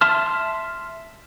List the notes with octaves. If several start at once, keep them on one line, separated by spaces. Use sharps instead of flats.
E5 A5 C6 F6